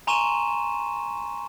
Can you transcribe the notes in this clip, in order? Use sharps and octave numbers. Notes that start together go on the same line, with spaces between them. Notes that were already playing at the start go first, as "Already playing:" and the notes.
G#5 A#5 C6 C#6 D#7 E7